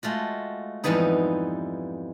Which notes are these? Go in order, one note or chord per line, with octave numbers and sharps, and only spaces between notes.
G#3 A3 F4 F#4
F2 G#2 E3 G3 B3 D#4